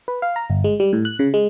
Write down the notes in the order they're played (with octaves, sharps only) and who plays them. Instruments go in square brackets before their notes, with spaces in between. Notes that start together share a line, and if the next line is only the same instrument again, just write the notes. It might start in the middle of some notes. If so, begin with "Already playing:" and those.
[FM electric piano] B4
F5
A#5
G1
G#3
G3
A2
F#6
C#3
G#3